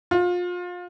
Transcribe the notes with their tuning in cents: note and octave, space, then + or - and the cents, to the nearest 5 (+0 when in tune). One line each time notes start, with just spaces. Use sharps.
F4 +30